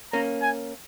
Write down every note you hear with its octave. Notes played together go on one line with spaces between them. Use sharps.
A#3 C#4 A#5
G#5